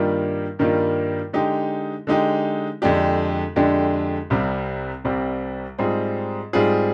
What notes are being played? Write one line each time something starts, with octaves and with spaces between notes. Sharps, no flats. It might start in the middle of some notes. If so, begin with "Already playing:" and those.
Already playing: G2 D#3 G3 A#3 F4
G2 D#3 G3 A#3 F4
D3 G#3 D#4 G4
D3 G#3 D#4 G4
F2 D3 G#3 D4 G4
F2 D3 G#3 D4 G4
C2 C3 G3 C4
C2 C3 G3 C4
G#2 G3 C4 F4 G#4
G#2 G3 C4 F4 G#4